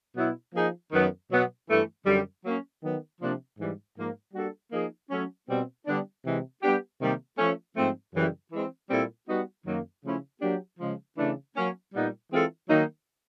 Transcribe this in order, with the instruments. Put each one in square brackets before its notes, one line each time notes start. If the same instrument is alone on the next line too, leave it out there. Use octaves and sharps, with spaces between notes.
[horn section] B2 F#3 B3 E4
F3 A#3 D#4 G#4
F#2 D#3 F#3 B3
B2 F#3 B3
G2 E3 A3
F#2 D3 G3
F#3 A#3 C#4
D#3 F#3 B3
C3 F3 A#3 D4
G#2 E3 G3
G#2 F3 A#3
G3 A#3 D4 F#4 A4
F3 A#3 D#4 G#4
F#3 A3 C#4
B2 G3 C4
D3 G3 B3 D4
C3 E3 G#3
G3 B3 D4 G4
C3 D#3 G3 A#3
F3 A3 C#4
G#2 F3 A3 C4
F#2 C#3 E3 G3
E3 G#3 C4
A#2 G3 C4 E4 A4
G3 B3 D#4 F#4
F#2 D#3 F#3 A#3
C#3 F3 A3 C#4 E4
F#3 A#3 D4 G4
C#3 F3 G#3
C#3 E3 A3 D4
F#3 A#3 C#4
A#2 G3 B3 D#4
E3 G#3 C4 F4 A4
D#3 F#3 A#3 D#4